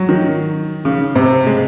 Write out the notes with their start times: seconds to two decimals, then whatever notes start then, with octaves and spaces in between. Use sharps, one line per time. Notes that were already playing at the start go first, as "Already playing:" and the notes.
Already playing: F#3
0.09 D#3
0.85 C#3
1.16 C3
1.47 G#3